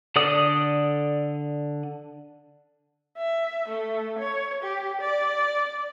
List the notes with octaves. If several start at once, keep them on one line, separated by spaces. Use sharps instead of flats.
D3 A4 D5 D#6
E5
A3
C#5
G4
D5